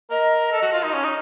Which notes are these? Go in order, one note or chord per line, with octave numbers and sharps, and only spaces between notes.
A#4 D#5
A4
F#4
F4
D#4
C#4
D#4